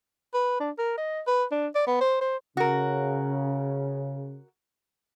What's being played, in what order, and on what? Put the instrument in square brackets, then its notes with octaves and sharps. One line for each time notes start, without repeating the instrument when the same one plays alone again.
[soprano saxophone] B4
D4
A#4
D#5
B4
D4
D5
B3
C5
C5
[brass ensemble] C#3 [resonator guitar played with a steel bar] F#4 A#4